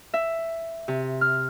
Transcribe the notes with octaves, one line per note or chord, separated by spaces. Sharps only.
E5
C3
F6